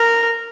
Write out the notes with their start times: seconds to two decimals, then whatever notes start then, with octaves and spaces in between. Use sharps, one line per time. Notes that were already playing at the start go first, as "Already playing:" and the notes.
Already playing: A#4